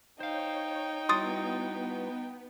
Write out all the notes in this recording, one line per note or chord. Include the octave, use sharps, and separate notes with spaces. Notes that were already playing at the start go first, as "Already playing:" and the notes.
D#4 C5 C#5 F5 G5
G3 B3 E4 F#4 C6 D#6 A6